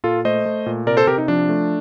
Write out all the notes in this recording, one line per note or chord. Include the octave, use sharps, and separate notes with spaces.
A#2 F4 A4
A3 C5 D#5
A3
A#2
C3 A#4 D5
A4 C5
C3 G4 A#4
D#4
F3 D4
A3